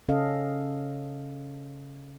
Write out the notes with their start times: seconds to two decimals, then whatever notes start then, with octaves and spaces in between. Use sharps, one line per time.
0.08 C#3 C#4 A4 D#5 F5